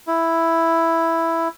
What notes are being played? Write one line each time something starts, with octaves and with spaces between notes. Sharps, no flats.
E4